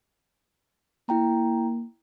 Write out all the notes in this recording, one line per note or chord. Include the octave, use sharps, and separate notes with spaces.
A#3 E4 G5 A#5